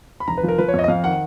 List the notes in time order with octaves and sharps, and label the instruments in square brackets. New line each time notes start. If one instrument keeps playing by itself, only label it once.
[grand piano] B5
F1 A#5
B4
F3
A#4
F3 B4
C#5
F2 D#5
D#5
F2 F5
D#3 F#5